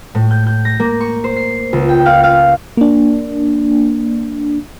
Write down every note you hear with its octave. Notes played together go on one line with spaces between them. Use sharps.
A2
G6
G6
A#6
A#3
C#6
C5
C7
C#2
G5
F5
F5
A#3 D4